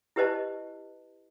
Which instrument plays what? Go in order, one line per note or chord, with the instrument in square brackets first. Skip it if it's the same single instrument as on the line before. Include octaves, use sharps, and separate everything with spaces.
[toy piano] E4 G4 B4 C5 D#5 A5